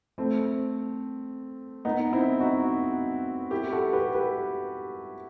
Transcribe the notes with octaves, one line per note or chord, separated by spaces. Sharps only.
A3 C4
B3 D#4
C4 E4
D#4 F#4
E4 G4
F#4 A4
G4 B4
G4 B4